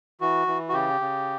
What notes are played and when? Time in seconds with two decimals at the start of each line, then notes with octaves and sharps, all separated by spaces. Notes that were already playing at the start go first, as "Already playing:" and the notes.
0.21 E3 F#4
0.47 E3
0.69 F#4
0.73 C#3 G4
1.01 C#3